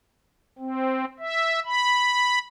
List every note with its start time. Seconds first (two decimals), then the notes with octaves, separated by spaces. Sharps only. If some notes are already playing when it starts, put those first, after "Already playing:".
0.59 C4
1.19 E5
1.65 B5